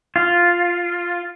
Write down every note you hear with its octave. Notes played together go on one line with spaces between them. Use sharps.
F4